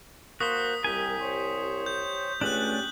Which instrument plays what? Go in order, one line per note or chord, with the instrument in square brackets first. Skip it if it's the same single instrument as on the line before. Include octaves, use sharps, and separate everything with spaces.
[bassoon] A#3 [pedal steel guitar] F#4 C5 [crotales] D#6 B6
[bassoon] C2 [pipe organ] G3 A#4 [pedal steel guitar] G4 G#5
[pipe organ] C5 C#5
[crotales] G6
[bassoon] C#2 [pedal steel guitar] A3 C#4 D4 [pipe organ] G4 [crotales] F#6 F#7